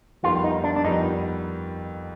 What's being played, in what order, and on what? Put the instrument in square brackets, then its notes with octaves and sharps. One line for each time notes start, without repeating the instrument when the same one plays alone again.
[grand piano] F2 D#3 G3 B3 [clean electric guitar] F4
[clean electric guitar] D#4
D4
D4
[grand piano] F2 D#3 G3 B3 [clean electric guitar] D#4